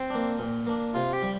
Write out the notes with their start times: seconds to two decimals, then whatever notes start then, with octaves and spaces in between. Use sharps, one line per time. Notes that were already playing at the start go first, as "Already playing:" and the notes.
Already playing: C4
0.10 A#3 D4
0.39 A#2
0.67 A#3 D4
0.94 C3 F4
1.13 G4
1.23 G3